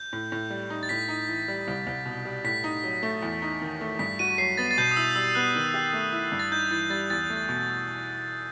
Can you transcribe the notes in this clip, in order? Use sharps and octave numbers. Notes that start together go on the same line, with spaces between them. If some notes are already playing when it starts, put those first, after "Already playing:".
Already playing: G6
A2
A2
G3
D#4
A6
A2 B6
D#4
E3
G3
C2
C2
B2
G3
A2 B6
D#4
F#3
A3
E2
D#4
D#3
A3
G2 B6
F#4 D#7
F#3 C7
B3 A6
A6
B2 G6
D#6
E4 E6
G3 E6
B3 F#6
D#3
G4
A3
E4
G2
A6
D#4 G6
E3 A6
G3 A6
E2 A6
A3
B2